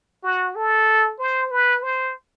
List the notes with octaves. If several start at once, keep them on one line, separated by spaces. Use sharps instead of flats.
F#4
A4
C5
B4
C5